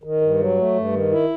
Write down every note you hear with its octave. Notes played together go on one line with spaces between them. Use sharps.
D#3
G2
F#3
A3
G2
D#3
E4